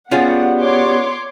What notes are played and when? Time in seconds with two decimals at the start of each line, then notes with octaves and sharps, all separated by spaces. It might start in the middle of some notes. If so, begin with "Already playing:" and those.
0.11 G3 B3 C#4 F4 F#4 G#4 F#5
0.60 C#5 C6 D6